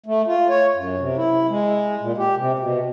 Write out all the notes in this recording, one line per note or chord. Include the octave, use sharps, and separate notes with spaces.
A3
F4
C#5
F#2
C3
E4
G#3
A#2
G4
C3
B2